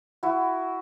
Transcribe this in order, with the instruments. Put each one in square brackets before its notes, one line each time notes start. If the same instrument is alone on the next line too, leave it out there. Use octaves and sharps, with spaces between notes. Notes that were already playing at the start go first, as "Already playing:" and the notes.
[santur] E4 F#4